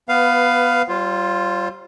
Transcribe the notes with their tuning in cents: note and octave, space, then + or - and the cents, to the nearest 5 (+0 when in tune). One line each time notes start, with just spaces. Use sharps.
B3 +0 B4 +15 F5 +0
G3 -30 F4 +0 C5 +30